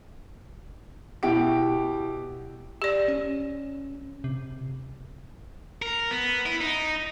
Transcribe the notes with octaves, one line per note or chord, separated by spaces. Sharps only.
B2 E4 G4 D7
G4 D5
C#4
C3
A#4
B3
E4
D#4